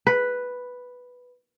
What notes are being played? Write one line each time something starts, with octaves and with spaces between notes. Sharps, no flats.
B4